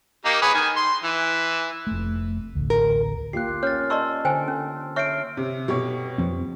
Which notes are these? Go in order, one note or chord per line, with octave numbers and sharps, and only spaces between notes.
A#3 D#4 G4
G#4 B4 C#5
D#3 G#5
C6
E3
F1 A3
A1 D2
A#4
A#3 F4 G4 F#6 C7
C#4 C#5 F6 A6
D5 D#5 A5 C6 C#6 E6
D3 C5 G5 G#5
C#4
C#5 E5 C#6 F6 C7 D7
C3
B2 A3 B3 G4 C#5
F2 F3 C4